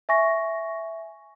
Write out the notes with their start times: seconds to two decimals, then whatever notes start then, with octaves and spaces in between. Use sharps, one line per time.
0.09 E5 G#5 C#6 A#6